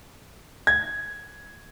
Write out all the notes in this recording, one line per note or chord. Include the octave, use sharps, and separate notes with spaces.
G#6